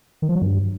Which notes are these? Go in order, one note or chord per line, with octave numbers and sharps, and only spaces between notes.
D#3
F3
F#3
G2